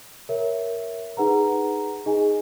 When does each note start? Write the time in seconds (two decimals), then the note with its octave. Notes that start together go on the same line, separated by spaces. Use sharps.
0.29 A#4 C#5 E5
1.17 D#4 G#4 B4 F#5 A#5
2.06 D#4 G#4 D#5 G#5